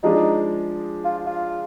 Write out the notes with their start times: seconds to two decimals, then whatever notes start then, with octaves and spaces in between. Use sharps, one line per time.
0.03 F3 G#3 D4 D#4
1.05 F4
1.27 F4